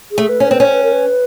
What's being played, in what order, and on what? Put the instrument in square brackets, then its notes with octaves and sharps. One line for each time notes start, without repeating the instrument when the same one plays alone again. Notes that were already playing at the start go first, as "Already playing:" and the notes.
[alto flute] G#4
[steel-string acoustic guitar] A3
[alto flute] B4
[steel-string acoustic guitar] C#4 [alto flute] C5
[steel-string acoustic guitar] C4 [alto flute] B4
[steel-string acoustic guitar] C#4
[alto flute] C5
B4
A#4
B4